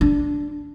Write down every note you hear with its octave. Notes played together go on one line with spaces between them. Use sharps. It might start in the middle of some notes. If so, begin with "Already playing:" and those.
D4